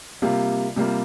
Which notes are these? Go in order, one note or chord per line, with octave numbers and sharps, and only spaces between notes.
C3 G3 A#3 F4
C3 G3 A#3 F4